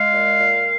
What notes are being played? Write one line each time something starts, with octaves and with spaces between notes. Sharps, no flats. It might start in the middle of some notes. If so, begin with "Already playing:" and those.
Already playing: G#3 F5
A#2
A#2